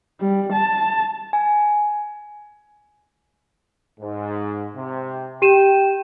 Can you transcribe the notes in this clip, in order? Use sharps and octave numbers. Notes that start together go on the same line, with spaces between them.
G3
A5
G#5
G#2
C3
G4 G5 D#7 E7